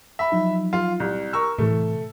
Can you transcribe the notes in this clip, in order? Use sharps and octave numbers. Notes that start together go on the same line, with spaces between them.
E5 B5
F3 F#3 D#4
F4
C2
A#4 C#6 E6
A2 C3 E3 A3